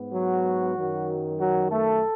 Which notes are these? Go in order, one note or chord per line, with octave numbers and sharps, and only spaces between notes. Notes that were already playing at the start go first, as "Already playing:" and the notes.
Already playing: G#2 B3
F#3 F#4
F#2 D#3 F#3
F#3 F#4
A3 A4